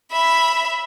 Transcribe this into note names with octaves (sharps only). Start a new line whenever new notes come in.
E5 B5